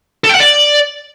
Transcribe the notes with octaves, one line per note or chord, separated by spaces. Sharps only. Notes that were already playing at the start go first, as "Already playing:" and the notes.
A4
G5
F#5
D5